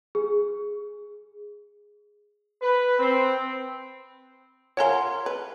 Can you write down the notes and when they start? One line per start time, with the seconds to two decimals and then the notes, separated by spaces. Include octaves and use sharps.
0.15 G#4
2.62 B4
2.99 C4
4.77 F4 A#4 C#5 F5 F#5 G#5 C6
5.26 B4